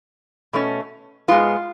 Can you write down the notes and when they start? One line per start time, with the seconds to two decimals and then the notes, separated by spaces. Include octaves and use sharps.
0.53 B2 A3 C#4
1.28 G#2 G#3 B3 F4